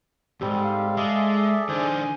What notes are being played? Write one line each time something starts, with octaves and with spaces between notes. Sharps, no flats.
D#2 G#2 G3 C4 G4 A4
F5
G#3 G#4 A4 D5 E5
D#3 D4 C5 G#5